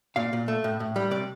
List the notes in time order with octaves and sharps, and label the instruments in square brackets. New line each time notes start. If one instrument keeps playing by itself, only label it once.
[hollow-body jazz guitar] A#2 F5
A#2
A3
A2
A2
G3
C3 D5